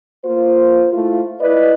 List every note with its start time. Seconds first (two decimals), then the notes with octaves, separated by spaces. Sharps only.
0.24 A#3 F4 C5
0.93 A3 E4 F4
1.40 E4 B4 D5 D#5